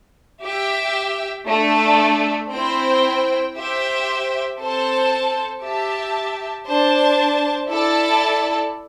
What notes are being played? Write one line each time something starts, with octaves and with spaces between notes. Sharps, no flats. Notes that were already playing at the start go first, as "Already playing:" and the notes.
G4 E5 G5
A3 D4 A4
C4 E4 C5 G5
G4 C5 E5 G5
C4 A4 C5 A5
G4 E5 A5
D4 C5 A5
E4 A4 D5 A5